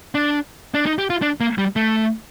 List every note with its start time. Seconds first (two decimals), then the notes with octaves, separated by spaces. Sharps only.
0.15 D4
0.74 D4
0.86 D#4
0.99 G4
1.10 F4
1.22 D4
1.40 A#3
1.58 G3
1.76 A3